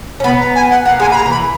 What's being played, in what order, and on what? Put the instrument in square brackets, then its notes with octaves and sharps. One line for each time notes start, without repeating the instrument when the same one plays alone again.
[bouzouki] C#4
[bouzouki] B3 [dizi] B5
[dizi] A#5
G#5
F#5
[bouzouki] A#3 [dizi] F#5
[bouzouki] G#3 [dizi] G#5
[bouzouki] A#3
[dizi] B5
A#5
[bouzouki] E3
[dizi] B5